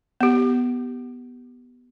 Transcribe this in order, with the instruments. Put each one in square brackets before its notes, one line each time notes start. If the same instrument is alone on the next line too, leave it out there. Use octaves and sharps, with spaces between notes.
[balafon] B3 G4